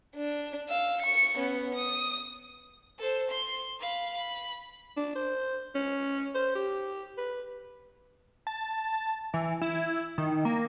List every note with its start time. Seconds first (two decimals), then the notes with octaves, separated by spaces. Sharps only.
0.16 D4
0.70 F5 E6
1.02 C#6 C#7
1.38 B3 C#4
1.75 D#6
2.99 A4 C5
3.30 C6
3.80 F5 B5
4.17 B5
4.97 D4
5.16 C5
5.75 C#4
6.34 C5
6.55 G4
7.18 B4
8.47 A5
9.34 E3
9.62 E4
10.18 D#3
10.45 A#3